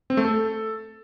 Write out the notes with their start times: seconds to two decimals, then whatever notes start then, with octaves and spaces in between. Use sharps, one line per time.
0.10 C4
0.17 A3
0.25 A4